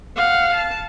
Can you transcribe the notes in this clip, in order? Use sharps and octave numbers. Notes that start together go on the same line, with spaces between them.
F5 F#5
A5